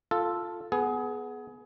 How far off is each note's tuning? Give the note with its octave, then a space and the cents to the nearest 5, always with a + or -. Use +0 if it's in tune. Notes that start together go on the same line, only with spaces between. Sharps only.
F4 +0 A4 +0
B3 +0 G#4 +25